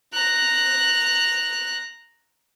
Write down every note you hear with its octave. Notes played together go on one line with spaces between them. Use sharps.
A#5 F#6